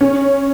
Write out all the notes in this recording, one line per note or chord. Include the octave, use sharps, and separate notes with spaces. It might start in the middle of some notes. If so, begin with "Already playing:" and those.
C#4